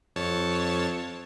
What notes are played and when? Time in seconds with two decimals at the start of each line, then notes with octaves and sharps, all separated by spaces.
0.16 F2 C#5 A5